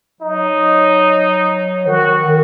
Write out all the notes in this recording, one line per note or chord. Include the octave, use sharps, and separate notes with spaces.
F#3 D#4
D#3 F#4
D#3